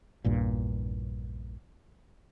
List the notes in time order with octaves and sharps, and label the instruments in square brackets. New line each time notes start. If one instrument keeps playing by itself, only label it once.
[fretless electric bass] A#1 E2 G2 A#2